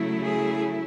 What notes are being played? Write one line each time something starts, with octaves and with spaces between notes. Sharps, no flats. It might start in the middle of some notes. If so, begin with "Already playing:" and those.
Already playing: C#3 F#3 A3 E4
G#4